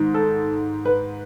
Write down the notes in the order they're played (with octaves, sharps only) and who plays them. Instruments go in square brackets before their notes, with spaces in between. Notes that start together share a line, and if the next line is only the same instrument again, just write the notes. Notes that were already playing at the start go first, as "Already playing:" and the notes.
Already playing: [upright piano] G#2 D#3
A4
B4